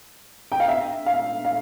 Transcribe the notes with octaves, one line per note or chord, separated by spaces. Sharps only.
G5
F5
E5
F5
F5